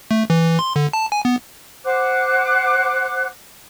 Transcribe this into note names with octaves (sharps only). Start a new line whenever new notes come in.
A3
E3
C6
D3
A5
G#5
B3
C5 F#5 D6 F#6